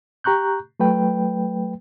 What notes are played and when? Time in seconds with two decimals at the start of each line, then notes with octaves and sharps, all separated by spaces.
0.24 G4 A#5 C#6 F#6 G6
0.80 F#3 A3 B4 G5